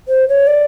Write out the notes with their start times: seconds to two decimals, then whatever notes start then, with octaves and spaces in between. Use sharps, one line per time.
0.08 C5
0.28 C#5
0.47 D5